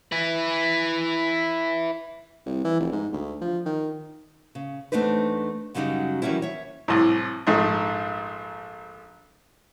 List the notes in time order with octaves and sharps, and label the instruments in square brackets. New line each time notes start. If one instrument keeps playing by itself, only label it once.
[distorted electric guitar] E4 B4
[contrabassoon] C2
E3
F1
G#2
D2
F3
D#3
[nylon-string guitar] C#3
E2 A3 C4 D4 D#4 B4
F#2 C#3 F#3 G3 D4 D#4
D#3 E3 F#3 G3 C#4 E4
C#5 E5
[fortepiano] C2 A2
A#1 G#2 A3